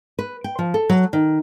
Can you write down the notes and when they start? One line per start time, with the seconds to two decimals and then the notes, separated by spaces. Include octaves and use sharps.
0.19 B4
0.44 G5
0.59 F3
0.74 A4
0.89 F#3
1.13 D#3